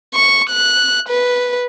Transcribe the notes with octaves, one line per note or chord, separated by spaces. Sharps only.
C#6
F#6
B4